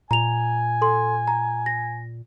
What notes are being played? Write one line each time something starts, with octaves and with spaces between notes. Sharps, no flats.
A#2 G#5 A#5 F7
A4 C6
A#5
A#6